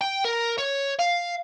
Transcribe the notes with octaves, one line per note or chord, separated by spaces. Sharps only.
G5
A#4
C#5
F5